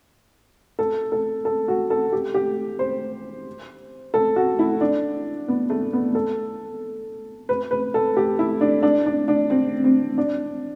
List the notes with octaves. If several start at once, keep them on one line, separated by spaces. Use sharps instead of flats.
A4
A4
A4
F#4
A4
G4
G4
C5
A4
F#4
E4
D4
B3
A3
B3
A4
B4
B4
A4
G4
E4
D4
D4
D4
D4
C4
C4
D4